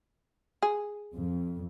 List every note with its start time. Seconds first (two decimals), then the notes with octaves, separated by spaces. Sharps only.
0.63 G#4
1.16 F2